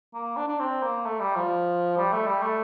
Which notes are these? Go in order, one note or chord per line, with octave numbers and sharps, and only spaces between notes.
A#3
D4
D4
C4
A#3
A3
G3
F3
G3
A3
G3
A3